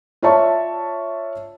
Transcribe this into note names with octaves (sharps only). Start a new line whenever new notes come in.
F4 C#5 D5 E5 A5 C#6